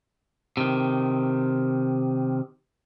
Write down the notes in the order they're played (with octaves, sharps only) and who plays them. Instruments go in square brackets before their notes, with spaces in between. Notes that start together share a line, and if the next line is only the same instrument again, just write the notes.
[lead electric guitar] C3 D#3